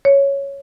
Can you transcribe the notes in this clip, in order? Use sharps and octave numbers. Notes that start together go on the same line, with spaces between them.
C#5